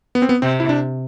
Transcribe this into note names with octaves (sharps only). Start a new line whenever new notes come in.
B3
C4
B3
C3 C4
E4
D4